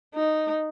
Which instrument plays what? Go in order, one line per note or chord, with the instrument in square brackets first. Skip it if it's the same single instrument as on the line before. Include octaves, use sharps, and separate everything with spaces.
[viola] D#4